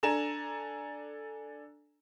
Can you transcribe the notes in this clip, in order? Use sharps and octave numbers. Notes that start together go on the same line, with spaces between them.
D4 A4 G#5 A#5 E7